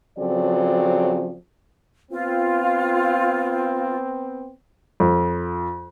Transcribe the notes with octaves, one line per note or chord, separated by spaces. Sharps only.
C#3 F3 F#3 C4 A4 D5
B3 C4 F4
F2